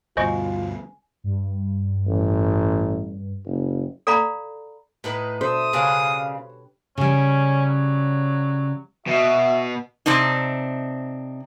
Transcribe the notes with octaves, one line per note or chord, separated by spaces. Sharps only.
D2 G2 B2 F4 C5 D#5 G#5 C#6
G2
A1
F#1
A4 D5 F5 A#5 B5
A2 D#4 B4
B2 D4 A4 C5 E5 D#6
C#3 D4 G4 B4 C#5 F5
C#3 G3 C#4
F#3
B2 F#4 E5
C3 C4 D4 D#4